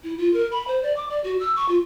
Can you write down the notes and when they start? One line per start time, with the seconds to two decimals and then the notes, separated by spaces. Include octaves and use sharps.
0.04 E4
0.18 F4
0.34 A#4
0.51 B5
0.68 C5
0.83 D5
0.96 D6
1.10 D5
1.24 F#4
1.40 E6
1.56 C#6
1.69 F4